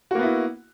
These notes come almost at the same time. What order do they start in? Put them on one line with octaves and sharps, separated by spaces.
F#4 A#3 B3 E4